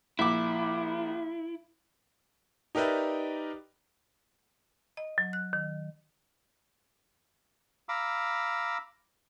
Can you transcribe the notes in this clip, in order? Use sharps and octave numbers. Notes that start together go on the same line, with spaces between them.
A#1 E4 D6
D#4 G4 A#4 B4 D5 E5
D#5
F#3
F#6
D#3
F5 A#5 B5 D6 E6